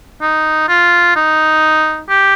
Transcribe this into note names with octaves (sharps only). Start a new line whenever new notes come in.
D#4
F4
D#4
G4